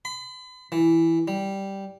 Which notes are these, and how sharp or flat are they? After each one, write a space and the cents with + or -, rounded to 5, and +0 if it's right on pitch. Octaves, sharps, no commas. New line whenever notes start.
B5 +40
E3 +0
G3 -5